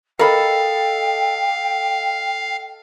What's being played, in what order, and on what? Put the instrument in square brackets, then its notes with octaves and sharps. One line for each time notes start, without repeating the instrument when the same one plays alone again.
[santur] A4 D#5 A5 [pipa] A#4 B5 [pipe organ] F5 [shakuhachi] G5